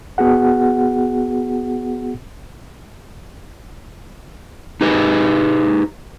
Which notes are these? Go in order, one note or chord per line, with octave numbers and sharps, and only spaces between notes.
B3 F#4 G#4 F#5
D#4 G4 G#4 B4 D#5